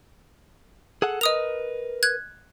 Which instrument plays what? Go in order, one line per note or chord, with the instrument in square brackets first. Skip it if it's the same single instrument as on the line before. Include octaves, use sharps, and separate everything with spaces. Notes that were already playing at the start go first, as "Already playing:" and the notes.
[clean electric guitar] G#4 A4 F#5
[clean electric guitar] A#4 B4 [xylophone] D#5 D#6 F7
[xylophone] F#6 G#6